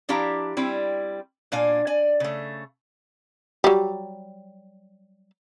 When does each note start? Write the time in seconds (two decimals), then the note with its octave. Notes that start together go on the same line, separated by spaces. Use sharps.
0.09 F3 D4 E4 G4 F5 A#5
0.57 G3 C4 E4
1.52 A#2 D4 F5 G#5
1.87 D5 G#5
2.20 C#3 A3
3.64 F#3 G3